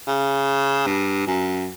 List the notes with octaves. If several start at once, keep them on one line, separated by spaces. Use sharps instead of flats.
C#3
G2
F#2